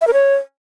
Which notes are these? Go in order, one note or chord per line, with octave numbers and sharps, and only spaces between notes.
E5
A#4
C#5